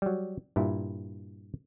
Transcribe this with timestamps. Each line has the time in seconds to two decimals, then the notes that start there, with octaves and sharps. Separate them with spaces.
0.02 F#3 G3
0.56 G2 A#2 E4